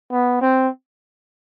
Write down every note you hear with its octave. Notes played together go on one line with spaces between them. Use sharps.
B3
C4